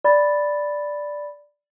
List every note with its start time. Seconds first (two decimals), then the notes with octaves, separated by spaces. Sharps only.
0.04 D5 B5 A6